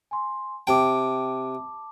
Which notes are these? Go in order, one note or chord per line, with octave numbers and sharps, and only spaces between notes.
G#5 C6
C3 G5 A5 D6